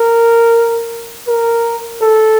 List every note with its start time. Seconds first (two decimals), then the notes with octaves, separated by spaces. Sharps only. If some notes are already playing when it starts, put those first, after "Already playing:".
Already playing: A#4
1.27 A#4
2.01 A4